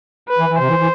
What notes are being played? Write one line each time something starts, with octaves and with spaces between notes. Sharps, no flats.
B4
E3
E3
C3 C5
E3
E3